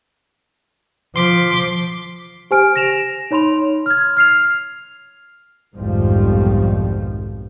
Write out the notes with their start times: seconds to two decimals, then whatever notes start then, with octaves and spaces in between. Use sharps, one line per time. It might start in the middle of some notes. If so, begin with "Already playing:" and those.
1.16 F3 C6 D6 B6
2.51 G4 C5 G#5 F6 D7
2.76 A#6 D7 E7 F7
3.31 D#4 C#5 B5 C6 F7
3.86 F6 G#6
4.17 F6 C7 F7
5.76 B1 F2 G#2 D#3 F3 G3